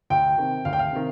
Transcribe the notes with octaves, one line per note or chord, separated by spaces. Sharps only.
D2 G5
C3 D#3
D2 F5
G5
F5
C3 D#3